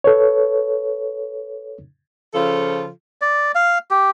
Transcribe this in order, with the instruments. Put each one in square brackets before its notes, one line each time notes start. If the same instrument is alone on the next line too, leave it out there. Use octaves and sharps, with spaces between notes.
[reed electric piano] A4 B4 C#5
[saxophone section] C#3 F3 F4 A4
[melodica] D5
F5
G4